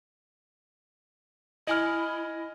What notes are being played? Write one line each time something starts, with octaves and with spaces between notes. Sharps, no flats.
E4 D#5 G#5 F6